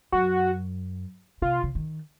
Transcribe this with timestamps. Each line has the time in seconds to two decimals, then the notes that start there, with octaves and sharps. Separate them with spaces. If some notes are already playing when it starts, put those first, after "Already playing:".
0.12 F#2 F#4
1.42 C3 F4
1.63 C#3
1.75 D#3